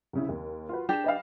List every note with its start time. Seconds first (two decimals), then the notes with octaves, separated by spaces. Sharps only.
0.13 C2 C#3 E4
0.29 D#2
0.69 F4 F#4 B4
0.89 D4 G4 G#4 E7
1.04 B4 D#5 F5